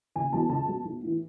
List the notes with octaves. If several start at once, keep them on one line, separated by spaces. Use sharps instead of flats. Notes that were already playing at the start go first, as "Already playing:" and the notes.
F#1 G#5
E2 B2 F#3 A5
C#2 A5
B2 F#3
B1
A2 E3